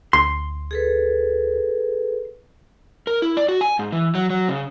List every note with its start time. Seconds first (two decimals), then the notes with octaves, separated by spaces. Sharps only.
0.13 D2 C6
0.71 G#4 A4 B4
3.07 A#4
3.22 E4
3.37 D5
3.49 F#4
3.61 G#5
3.79 G#2
3.92 E3
4.15 F#3
4.30 F#3
4.49 C#3